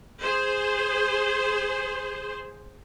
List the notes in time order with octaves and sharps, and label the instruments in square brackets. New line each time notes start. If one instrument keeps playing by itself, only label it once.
[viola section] G#4 C5